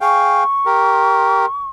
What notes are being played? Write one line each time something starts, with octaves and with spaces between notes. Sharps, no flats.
G#4 F5 G5 C#6
G4 A#4